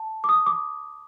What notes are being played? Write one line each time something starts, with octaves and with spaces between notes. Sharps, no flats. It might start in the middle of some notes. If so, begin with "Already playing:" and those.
Already playing: A5
D6
D#6
D6